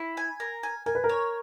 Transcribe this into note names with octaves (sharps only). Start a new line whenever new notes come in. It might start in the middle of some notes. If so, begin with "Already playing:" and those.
Already playing: E4
G#5
A#4
G#5
A#4 G#5
B4
A#4
C#5